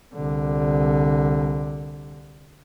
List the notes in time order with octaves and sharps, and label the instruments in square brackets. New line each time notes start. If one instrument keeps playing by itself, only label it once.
[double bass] C2 D3